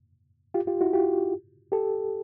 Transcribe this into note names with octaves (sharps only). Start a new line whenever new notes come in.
F4 G4
F4 G4
E4 F#4
F4 G4
G4 A4